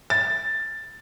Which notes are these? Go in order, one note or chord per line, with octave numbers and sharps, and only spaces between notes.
A6